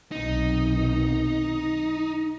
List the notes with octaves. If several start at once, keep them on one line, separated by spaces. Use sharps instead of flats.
B1 C3 D#3 D#4